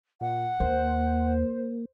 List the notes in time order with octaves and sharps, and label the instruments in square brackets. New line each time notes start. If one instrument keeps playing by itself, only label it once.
[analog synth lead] A#2 [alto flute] F#5
[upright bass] D#2 [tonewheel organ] A#3 [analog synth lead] C5